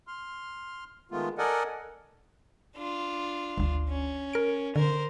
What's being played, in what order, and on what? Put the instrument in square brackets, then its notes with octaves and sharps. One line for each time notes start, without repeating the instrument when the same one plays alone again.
[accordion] C6 F6
D#3 G#3 A3 B3 F4
A4 A#4 D5 D#5 F#5 G#5
[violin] D4 F4
[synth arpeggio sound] G1 D2
[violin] C#4
[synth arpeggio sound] A#4 D7
[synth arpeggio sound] D3 [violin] A#4 C5